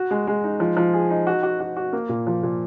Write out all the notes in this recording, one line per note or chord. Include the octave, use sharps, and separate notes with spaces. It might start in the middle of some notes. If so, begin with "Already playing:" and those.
Already playing: F#4
G#3
G#3
D#4
F3
F3
G#4
D#4
F#4
F#4
F#4
F#4
A#3
A#2
F3
A#2